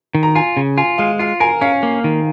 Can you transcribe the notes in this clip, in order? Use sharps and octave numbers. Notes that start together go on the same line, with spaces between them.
D#3
A#5
F4 G#5
C#3
F4 G#5
G#3 F5
F4 F5
A#4 G#5
C#4 F5
A#3
D#3